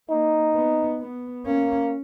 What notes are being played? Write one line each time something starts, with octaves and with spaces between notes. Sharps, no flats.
A#3 D#4
B3
B3
A#3 C#4